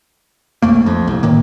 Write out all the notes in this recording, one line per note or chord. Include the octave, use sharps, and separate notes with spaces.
B1 F2 A3 A#3
F2
C2
G1 A2 D#3 A#3